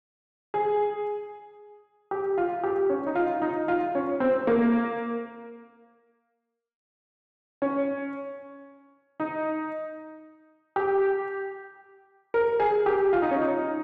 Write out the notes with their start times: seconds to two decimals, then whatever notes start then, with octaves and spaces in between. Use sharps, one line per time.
0.54 G#4
2.11 G4
2.38 F4
2.64 G4
2.90 C#4
3.07 D#4
3.15 F4
3.42 D#4
3.68 F4
3.95 C#4
4.20 C4
4.47 A#3
7.62 C#4
9.20 D#4
10.76 G4
12.34 A#4
12.60 G#4
12.86 G4
13.13 F4
13.22 D#4
13.31 C#4
13.41 D#4